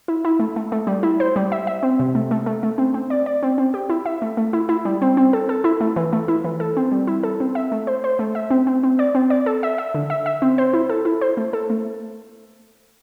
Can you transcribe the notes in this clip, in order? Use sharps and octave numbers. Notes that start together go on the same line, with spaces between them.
E4
E4
A3
A3
A3
G3
E4
C5
G3
E5
E5
C4
C3
A3
A3
A3
A3
C4
C4
D5
D5
C4
C4
G4
E4
E5
A3
A3
E4
E4
G3
C4
C4
A4
A4
E4
A3
E3
A3
E4
E3
A4
C4
G3
E4
A4
C4
E5
A3
C5
C5
A3
E5
C4
C4
C4
D5
C4
D5
A4
E5
E5
D3
E5
E5
C4
C5
E4
A4
E4
C5
A3
A4
A3